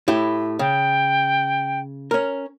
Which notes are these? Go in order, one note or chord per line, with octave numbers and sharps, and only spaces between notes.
A2 E4 G4
C#3 G5
C#4 A#4